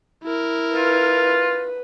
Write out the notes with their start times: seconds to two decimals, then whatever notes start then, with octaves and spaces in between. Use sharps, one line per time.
0.24 E4 A#4
0.75 F4 B4